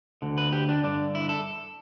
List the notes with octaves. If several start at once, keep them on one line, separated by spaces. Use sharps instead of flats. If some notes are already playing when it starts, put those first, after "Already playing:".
D2 D3
B4
G4
D4
G2 D3 D4
E4
A4